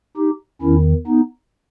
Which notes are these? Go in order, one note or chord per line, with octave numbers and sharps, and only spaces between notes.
D#4 G4
E2 D#3 C#4 E4
B3 D#4